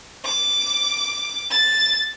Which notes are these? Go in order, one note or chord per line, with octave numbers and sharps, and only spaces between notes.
D6
A6